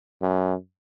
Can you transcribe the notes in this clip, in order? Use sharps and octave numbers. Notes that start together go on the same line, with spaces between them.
F#2